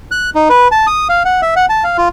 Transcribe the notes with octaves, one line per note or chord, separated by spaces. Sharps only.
F#6
D#4
B4
A5
D#6
F5
F#5
E5
F#5
A5
F5
F4